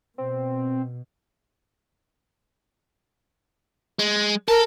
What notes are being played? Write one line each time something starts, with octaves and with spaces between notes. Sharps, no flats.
B2 C4
G#3
A4 A#4